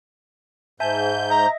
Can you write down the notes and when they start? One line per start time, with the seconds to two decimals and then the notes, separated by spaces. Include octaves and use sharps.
0.80 G#2 E5 G#5 A5 G6
1.30 D#5 E5 A#5 A#6